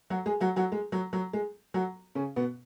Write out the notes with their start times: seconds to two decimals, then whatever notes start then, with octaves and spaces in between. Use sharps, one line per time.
0.10 F#3 F#4
0.26 G#3 G#4
0.41 F#3 F#4
0.56 F#3 F#4
0.72 G#3
0.92 F#3
1.13 F#3
1.33 G#3
1.74 F#3 F#4
2.15 C#3 C#4
2.36 B2 B3